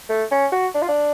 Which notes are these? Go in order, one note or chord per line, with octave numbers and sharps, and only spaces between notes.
A3
C#4
F#4
D4
F4
D4